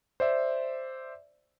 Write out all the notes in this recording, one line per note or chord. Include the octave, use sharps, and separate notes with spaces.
C5 D5 E5